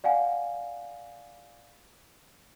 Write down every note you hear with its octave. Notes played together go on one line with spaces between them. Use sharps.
D5 F5 F#5 G#5